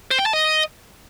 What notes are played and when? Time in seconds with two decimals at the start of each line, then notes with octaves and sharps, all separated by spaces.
0.11 C5
0.19 G5
0.26 A5
0.33 D#5